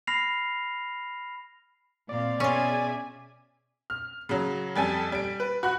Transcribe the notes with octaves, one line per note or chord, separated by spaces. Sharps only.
B5 F6 A#6 C7 F7
A#2 C4 D5 F5
B2 C#4 F4 G#4 E5 G#5
F6
C#3 F#3
F2 G3 A4 G#5
G3 D7
B4
F#4 B5 F#6